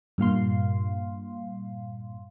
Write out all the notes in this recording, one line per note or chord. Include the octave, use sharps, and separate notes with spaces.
G2 A#2 F5 C6